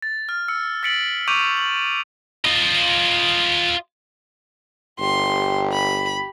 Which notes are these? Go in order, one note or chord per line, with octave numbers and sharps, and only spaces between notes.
A6
F6
E6 C#7
E6 A6 B6 C#7 D7 F#7
C#6 D6 G6 D7 D#7 F7
F#7
F4 D#5
G1 G4 C6
B5